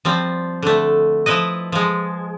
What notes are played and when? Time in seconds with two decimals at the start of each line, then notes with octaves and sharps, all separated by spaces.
0.05 F3 G3 C4
0.62 D3 A3
1.26 F3 E4 B4 D#5
1.72 F3 G#3